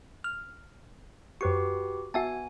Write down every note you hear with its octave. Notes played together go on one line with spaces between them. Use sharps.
F6
F#2 F#4 G4 B4 C#6
B3 F#4 E5 G#5 A5